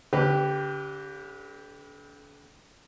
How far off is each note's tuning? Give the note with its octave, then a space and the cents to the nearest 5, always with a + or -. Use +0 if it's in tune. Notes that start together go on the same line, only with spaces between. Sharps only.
D3 -40 G4 +0 B4 +0